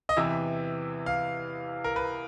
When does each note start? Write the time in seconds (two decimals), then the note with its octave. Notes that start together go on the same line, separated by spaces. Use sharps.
0.09 D#5
0.17 E2 C3 E3 E5
1.06 F5
1.84 A#4
1.96 B4